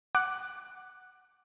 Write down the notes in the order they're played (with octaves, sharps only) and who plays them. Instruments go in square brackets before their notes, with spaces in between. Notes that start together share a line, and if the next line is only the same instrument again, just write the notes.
[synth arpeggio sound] F#5 D6 F#6